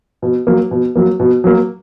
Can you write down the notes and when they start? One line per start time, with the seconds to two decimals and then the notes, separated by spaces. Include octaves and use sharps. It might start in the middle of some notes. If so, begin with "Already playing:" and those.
0.22 B2
0.47 F#3 A#3
0.71 B2
0.96 F#3 A#3
1.20 B2
1.44 F#3 A#3